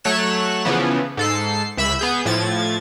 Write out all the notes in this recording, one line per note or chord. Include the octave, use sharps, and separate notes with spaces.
F#3 A3 C#5 F#6 E7
C#3 E3 F3 B3
G#2 A4 C7
C#2 E5 B5 E6
B3 G#4 G6
A2 F3 G#6 A6